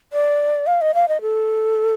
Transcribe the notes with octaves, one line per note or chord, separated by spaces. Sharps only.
D5
F5
D#5
F5
D#5
A4